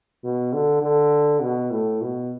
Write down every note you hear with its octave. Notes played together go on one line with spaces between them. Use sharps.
B2
D3
D3
B2
A2
B2